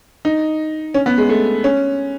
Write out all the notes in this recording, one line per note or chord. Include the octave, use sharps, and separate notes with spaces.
D#4
C#4
B3
G#3
A3
C#4